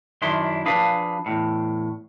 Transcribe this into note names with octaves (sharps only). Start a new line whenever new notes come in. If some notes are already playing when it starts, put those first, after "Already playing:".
F#2 D#3 D4 E4 C6
F3 D4 G#4 B4 F5
E2 A2